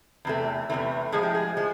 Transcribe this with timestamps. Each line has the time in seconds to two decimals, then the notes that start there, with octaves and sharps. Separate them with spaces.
0.25 E2 C3 E3 A3
0.70 E2 C3 E3 A3
1.12 A2 F3 G#3 G#4
1.23 G4
1.35 G#4
1.57 F3 G#3